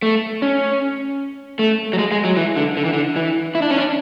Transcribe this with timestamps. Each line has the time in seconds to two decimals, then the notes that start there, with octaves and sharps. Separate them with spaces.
0.02 A3
0.42 C#4
1.59 A3
1.93 F#3
1.98 G#3
2.12 G#3
2.25 F#3
2.37 E3
2.56 D3
2.77 D3
2.85 E3
2.93 D3
3.16 E3
3.55 E4
3.62 D4
3.70 C#4
3.77 D4